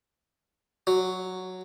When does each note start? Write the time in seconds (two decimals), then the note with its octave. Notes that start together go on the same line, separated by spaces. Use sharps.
0.87 F#3